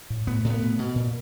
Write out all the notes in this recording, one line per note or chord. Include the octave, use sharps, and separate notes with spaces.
A2
A2 B3
A2
B3
B2
B2
A#2